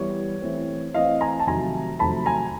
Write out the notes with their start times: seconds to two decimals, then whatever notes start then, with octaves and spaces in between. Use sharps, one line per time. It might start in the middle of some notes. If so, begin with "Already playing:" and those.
Already playing: E3 G3 B3 C#5
0.42 E3 A3 C4
0.94 E3 A3 C4 D#5 F5
1.21 G#5 A#5
1.40 A5
1.47 F2 C3 D#3 F#3 A3 G#5 A#5
1.99 F2 C3 D#3 F#3 A3 A5 B5
2.26 G#5 A#5